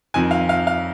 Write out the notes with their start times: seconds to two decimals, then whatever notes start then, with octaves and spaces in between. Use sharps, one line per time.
0.14 F2 D#3 C4 G#5
0.31 F5
0.49 F5
0.67 F5